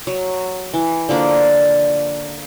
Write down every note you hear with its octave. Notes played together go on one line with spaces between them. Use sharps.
F#3
E3
D3 F3 A#3 D4